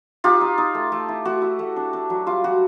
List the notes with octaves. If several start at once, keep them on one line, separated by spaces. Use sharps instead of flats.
D#4 F4 G4
D#4
D#4
A3
A3
E4
A3 F#4
E4
A3
D4
D4
F#3
G3 F4
G3 F#4